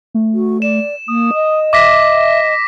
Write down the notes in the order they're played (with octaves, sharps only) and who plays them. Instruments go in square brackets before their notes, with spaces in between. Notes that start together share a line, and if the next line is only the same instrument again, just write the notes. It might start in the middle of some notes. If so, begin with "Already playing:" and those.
[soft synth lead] A3
[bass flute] F#4
[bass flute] D5 [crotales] E7
[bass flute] A#3 [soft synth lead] D#6
[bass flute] D#5
[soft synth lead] E5 [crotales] D6 A#6 B6